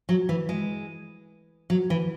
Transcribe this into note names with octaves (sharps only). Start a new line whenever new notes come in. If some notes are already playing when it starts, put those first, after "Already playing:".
F#3
E3
G#3
F#3
E3